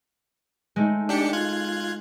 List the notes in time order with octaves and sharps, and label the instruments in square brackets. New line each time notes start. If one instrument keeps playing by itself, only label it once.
[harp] G#3 A3 D#4
[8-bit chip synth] D4 G4 C#7
F4 F#6 G#6